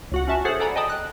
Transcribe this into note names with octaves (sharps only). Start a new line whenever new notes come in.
C#2 F#4 F#5
C#4 F#4 E5 A5
G#4 A4 C5 C#5 F#5
A4 D5 F#5 G#5 A#5 B5
D#5 G5 A5 B5 D#6
F#6